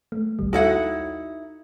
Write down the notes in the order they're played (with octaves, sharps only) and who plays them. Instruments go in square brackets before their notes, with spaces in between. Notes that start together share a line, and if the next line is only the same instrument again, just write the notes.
[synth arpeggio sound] A3
A#1 D#2 G3
[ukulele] D#4 E4 F#5 [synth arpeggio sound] F#4 A4 C#5